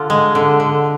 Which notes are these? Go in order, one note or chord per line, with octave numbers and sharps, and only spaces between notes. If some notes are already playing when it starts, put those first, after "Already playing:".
Already playing: D3 F4
G#3
D3
D3